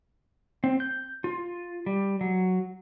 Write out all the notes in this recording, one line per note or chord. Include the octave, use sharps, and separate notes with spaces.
C4
G6
F4
G3
F#3